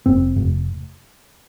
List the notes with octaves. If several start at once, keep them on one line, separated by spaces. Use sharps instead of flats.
F1 C4
F1